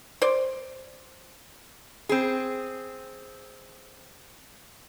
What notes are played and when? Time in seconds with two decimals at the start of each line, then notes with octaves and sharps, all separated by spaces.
0.22 C5 D5
2.09 C4 G#4